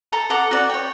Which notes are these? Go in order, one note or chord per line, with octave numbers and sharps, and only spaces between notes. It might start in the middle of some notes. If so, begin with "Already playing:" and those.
A4 A5 A#5
A4 F#5 A#5 D6
F#4 D5
C#5 G5